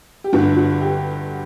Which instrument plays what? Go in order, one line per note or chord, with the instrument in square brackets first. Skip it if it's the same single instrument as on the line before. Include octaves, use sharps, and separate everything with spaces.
[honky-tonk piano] G4
G1 G2 D3 F#4
F#4
G4